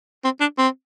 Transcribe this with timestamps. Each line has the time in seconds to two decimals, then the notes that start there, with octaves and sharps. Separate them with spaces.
0.24 C4
0.40 D4
0.58 C4